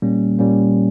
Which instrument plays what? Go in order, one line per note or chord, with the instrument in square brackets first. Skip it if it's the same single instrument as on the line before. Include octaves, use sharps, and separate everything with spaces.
[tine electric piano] A#2 G3 A#3 C#4
A#2 G3 A#3 C#4